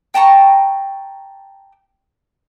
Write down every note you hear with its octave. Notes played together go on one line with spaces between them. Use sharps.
G5 A5 A#5 C#6